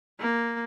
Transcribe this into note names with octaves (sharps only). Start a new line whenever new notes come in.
A#3